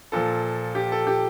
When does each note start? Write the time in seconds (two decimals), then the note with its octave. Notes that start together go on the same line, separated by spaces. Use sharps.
0.12 A#2 F3 A4
0.75 G4
0.92 A4
1.07 G4